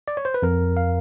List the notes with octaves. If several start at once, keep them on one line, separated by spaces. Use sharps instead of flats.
D5
C#5
C5
B4
F2 A#4
F5